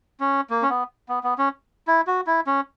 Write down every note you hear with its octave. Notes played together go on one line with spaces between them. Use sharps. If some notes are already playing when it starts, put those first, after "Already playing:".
C#4
A#3
C#4
B3
B3
B3
C#4
E4
F#4
E4
C#4